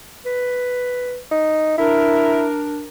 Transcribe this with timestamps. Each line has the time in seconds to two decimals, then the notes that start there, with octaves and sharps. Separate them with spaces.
0.26 B4
1.32 D#4
1.78 D4 E4 A#4